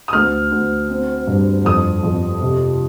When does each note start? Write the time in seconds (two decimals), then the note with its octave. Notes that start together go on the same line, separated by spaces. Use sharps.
0.08 D#6
0.13 D2 F6
0.52 D2
0.90 C4
1.27 G2
1.65 F2 D#6
2.03 F2
2.42 C3